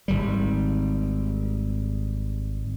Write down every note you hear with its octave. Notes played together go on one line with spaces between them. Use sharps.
G#1 G3